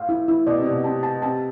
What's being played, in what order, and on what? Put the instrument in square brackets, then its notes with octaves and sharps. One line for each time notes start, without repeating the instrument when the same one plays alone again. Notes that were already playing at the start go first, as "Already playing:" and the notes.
Already playing: [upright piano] A2 [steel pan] F5
[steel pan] E4
E4
[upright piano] B2 [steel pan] D5
[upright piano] C3
[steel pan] D5
[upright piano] B2
[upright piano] C3 [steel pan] A5
[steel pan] A5
[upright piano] C3 [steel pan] A5